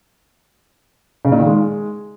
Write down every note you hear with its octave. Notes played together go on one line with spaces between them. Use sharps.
C#3
A#2
D#3
G#3